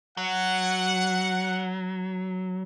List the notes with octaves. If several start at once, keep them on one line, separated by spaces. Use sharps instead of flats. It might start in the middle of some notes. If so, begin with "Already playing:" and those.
F#3 F#5